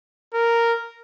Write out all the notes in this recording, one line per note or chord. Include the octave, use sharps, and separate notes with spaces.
A#4